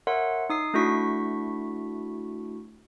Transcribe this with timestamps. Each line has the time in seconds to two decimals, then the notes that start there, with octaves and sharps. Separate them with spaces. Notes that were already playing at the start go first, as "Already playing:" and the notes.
0.07 A#4 C#5 E5 F#5 C6
0.50 D#4 D#6 C7
0.74 A3 D4 E4 F#4 C#6 B6